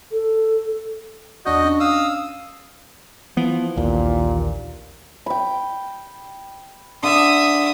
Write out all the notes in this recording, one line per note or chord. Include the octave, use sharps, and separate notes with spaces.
A4
E2 D4 F#4 D#5 G6
C#4 D4
F5 D#6 E6
E3 F3 B3
A#1 D#2 A#2
G5 B5
D3 E5 D#6